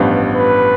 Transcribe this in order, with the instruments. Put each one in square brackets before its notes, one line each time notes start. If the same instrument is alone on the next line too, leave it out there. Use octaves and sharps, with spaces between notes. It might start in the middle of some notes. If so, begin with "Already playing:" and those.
Already playing: [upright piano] A1 G2 F3 B3 F4
[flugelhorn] B4